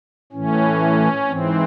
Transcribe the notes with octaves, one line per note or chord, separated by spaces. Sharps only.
A2 E3 C#4
G#2 E3 C4